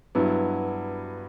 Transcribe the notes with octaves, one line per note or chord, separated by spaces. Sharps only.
G2 F#3 B3 E4